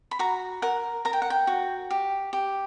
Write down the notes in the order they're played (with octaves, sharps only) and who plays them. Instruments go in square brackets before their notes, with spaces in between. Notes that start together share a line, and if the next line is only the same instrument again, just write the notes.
[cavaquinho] B5
F#4 A#5
A#4 F#5
A#4 A#5
G5
F#5
G5
F#4
G4
G4